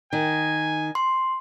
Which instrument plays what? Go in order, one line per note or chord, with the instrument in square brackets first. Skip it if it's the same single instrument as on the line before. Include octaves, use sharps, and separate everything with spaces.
[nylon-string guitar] D#3 [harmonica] G#5
[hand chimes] C6